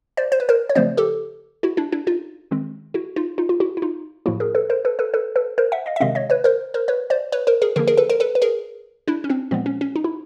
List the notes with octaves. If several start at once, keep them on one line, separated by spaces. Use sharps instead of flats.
C5 D5
C5
B4
A#4 C5
C#5
C#3 F3 A3 C4 C5 D5
G4 A4
E4 F#4
D4 E4
D4 E4
D#4 F4
D#3 G#3 C4
E4 F#4
D#4 F4
D#4 F4
F4
E4 F#4
E4
D#4 F4
A2 F3 A#3 E4 F#4
G#4 A#4
A4 B4
A#4 C5
A4 B4
A4 B4
A4 B4
A4 B4
A#4 C5
E5 F#5
D#5 F5
E5
C3 D#3 G#3 C4 D#5 F5
C#5 D#5
B4 C#5
A#4 C5
A#4 C5
B4 C#5
C5 D5
B4 C#5
A#4 C5
G#4 A#4
D3 F3 A#3 G#4 A#4
G#4 A#4
A4 B4
A#4 C5
A4 B4
B4
G#4 A#4
D4 E4
C#4
C4 D4
A#2 F3 G#3 B3 C4
C#4
C#4
D#4
E4